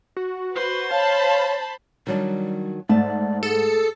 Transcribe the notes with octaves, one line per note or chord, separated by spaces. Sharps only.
F#4
B4 C5
C#5 F5 A5 B5
D#3 F#3 G3 D4
G#2 A3 D5 A5
G#4 A4